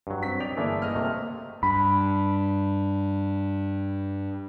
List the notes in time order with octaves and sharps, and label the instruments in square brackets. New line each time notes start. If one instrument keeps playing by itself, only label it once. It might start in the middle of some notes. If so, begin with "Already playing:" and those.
[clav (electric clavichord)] G2 F#3
[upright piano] C4 B6
[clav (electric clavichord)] D5 D#5 G5 [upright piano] F7
[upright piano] G1 A#3 D5 [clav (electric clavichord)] E3 A3 G#4
[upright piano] D#5 F6
[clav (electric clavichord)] C3 A3 A#3
[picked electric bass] G2 [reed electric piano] B5